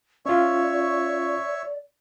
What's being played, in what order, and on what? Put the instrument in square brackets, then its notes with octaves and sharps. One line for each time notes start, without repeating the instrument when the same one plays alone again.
[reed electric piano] C#4 F4 [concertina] C#5 E5 C#6 [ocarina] D5